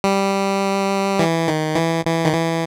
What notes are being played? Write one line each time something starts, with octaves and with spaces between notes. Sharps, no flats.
G3
E3
D#3
E3
E3
D#3
E3